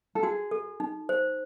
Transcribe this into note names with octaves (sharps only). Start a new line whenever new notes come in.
A4
F#4 G#4
A4
D#4
C5